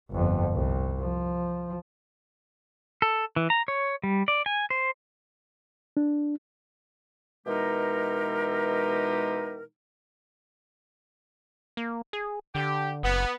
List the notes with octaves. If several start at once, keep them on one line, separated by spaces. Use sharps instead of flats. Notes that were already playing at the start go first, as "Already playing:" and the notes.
G1 F2
C2
F3
A4
E3
A#5
C#5
G3
D5
G#5
C5
D4
B2 E3 G#3 D#4 G4 A#4
A#3
G#4
D3 G4
F#1 B3